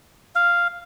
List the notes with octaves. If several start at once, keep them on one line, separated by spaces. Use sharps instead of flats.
F5